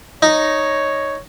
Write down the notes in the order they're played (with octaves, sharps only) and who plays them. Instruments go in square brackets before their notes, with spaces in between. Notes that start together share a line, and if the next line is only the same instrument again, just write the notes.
[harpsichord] D#4 [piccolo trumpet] C#5